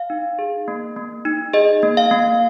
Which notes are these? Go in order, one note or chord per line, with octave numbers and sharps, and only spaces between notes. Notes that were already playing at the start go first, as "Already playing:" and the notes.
Already playing: F5
D#4
G#4
A#3
A#3
D#4
G#4 D#5
A#3
F5
A#3